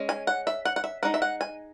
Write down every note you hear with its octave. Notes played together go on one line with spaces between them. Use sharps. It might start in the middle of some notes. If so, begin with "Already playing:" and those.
Already playing: G#3 C#4
G#5
F#5
E5
F#5
F#5
E5
G#3 D#4 F#5
E5
F#5
G#5